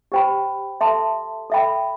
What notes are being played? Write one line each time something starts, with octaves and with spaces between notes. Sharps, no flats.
G4 C5 G5 B5
A4 E5 A5 C6
A4 E5 G5 B5